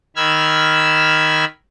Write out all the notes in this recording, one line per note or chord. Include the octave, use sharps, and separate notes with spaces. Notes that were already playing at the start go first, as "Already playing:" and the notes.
D#3 B5 E6 F6 G#6